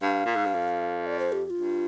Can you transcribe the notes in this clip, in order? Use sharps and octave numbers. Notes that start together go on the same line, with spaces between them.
G2 F5
A#2
G#2
G2
F2
D5
C5
G4
G4
F4
G2